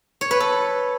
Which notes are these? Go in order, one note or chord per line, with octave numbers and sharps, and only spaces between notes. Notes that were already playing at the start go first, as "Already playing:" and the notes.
C#5
B4
A4